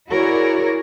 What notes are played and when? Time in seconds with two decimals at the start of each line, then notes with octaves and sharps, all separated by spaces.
0.11 E4 F#4 G#4 A#4 C#5 D5